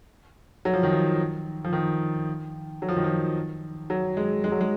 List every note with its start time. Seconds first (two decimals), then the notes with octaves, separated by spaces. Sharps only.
0.65 F#3
0.74 F3
0.83 D#3
0.92 F3
1.64 F3
1.73 D#3
2.82 F#3
2.88 F3
2.96 D#3
3.04 F3
3.90 F#3
4.17 G#3
4.44 G#3
4.52 F#3
4.61 G#3